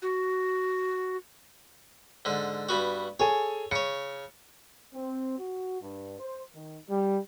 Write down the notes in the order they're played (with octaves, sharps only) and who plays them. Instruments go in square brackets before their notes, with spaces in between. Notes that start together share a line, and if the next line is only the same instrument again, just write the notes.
[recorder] F#4
[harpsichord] G#2 D3
G2 B3 F#4
[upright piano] G#4 A4 G#5 [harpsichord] C#5
[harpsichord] C#3 C#5 [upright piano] C#7
[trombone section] C4
F#4
G2
C5
D#3
G3